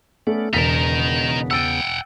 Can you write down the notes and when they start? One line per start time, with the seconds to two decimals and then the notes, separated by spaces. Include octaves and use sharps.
0.27 A3 B3 C#4 D5
0.53 E1 E2 C#3 B3 D#4 A#4 A6 B6
1.51 F#5 G5 E6 A6 D#7